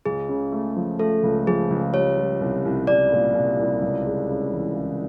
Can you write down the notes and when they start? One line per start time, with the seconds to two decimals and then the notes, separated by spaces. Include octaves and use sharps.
0.05 C#2 G#4
0.29 C#3
0.52 A3
0.76 F3
0.99 A3 A4
1.23 C#2
1.47 F3 G#4
1.70 C#2
1.93 G3 C#5
2.17 G3
2.41 C2
2.65 C2
2.87 C2 D5
3.12 A#2
3.35 C2
3.59 C2
3.82 C#2
4.06 G#3
4.29 C#3
4.53 E3
4.76 C#3